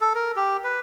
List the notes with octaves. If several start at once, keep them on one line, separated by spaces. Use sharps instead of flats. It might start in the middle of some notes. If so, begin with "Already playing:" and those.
A4
A#4
G4
B4